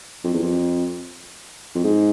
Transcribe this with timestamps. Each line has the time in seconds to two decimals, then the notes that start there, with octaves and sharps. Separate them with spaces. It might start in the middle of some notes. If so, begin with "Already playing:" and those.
0.24 F2
0.34 E2
0.42 F2
1.75 F2
1.84 G#2